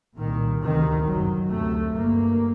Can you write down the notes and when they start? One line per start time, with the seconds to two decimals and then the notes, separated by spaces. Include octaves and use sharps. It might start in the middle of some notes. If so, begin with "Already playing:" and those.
0.19 C2 A#2 D#3
0.63 D2 C3 D#3
1.07 G1 F#2 F#3
1.50 D2 C3 A3
1.94 G1 G2 A#3